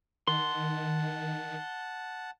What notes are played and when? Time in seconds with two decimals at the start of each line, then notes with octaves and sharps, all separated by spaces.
0.27 D#3 F#5 A5 C6